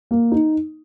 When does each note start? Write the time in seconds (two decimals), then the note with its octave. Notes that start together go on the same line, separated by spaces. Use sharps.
0.11 A#3
0.32 D#4